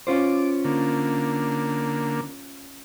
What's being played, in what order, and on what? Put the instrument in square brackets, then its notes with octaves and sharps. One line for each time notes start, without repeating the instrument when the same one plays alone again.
[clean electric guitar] C#4 F4 C5 [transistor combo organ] D6
[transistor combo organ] D3 A#3